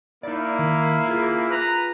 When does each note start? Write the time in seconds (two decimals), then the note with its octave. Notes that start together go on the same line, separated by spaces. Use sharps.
0.23 A#3 D#4 E4 D5
0.59 D#3
1.07 F4 G#4
1.49 B4 A#5